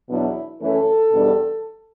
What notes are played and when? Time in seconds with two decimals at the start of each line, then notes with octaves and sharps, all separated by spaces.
0.10 E2 B2 F#3 B3 D4 E4
0.62 F#2 E3 A3 C#4 A4
1.13 E2 B2 G3 D4